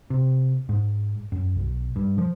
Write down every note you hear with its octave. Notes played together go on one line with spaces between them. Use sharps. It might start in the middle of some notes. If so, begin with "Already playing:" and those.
C3
G#2
F#2
B1
G2
F3